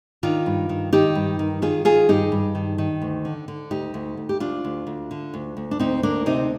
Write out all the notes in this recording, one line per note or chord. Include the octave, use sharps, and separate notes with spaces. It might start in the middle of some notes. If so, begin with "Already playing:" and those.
D#3 D4 F4
G2
D#3
D#3 D#4 G4
G2
D#3
D#3 F4 G#4
D#3 F4 G#4
G2 D#4 G4
G2
D#3
D#3
D2
D3
D3
D2 D#4 G4
D2
D2
G4
D2 D4 F4
D2
D2
D3
D2
D2
D4
D2 C4 D#4
D2 A#3 D4
C3 C4 D#4